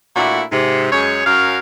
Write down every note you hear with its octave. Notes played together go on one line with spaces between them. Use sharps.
A#2 A3 A#3 D4 E4 F#4
G#2 C3
F#2 G#3 G#4 C#5
F#2 C#4 F#4 A#4 C#5 F5